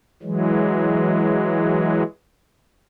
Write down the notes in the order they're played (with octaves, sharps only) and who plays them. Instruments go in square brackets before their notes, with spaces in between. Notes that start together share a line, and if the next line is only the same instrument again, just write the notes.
[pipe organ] E3 F#3 G#3